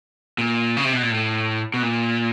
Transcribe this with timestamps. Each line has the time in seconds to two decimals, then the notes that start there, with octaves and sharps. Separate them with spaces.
0.38 A#2
0.77 C#3
0.84 C3
0.93 B2
1.02 A#2
1.11 A2
1.74 B2
1.83 A#2